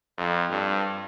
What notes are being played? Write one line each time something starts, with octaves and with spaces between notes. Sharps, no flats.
F2
G2